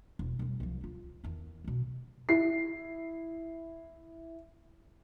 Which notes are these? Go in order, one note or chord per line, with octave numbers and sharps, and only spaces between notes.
E1
E1 G3
C2 F3
D2 F4
E2 D#3
D2 B2
E4 C7